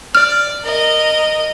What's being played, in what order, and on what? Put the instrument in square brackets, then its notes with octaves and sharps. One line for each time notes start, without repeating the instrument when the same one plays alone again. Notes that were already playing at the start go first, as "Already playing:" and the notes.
[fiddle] D5 [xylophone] F6
[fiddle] A#4 D#5